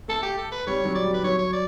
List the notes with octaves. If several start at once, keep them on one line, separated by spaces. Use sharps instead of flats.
A3 A4
G4
A4
B4
G3 C#5
F#3
D5
G3
B4
F#3 C#5
C#5
D5